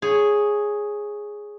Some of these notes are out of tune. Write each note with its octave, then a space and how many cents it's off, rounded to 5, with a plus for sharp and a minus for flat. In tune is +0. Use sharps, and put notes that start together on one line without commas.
G#4 +0 C#5 +0